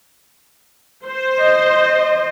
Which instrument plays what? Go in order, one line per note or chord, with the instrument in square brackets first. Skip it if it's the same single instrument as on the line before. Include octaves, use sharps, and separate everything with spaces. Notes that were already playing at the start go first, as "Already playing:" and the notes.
[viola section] C5
[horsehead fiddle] D#5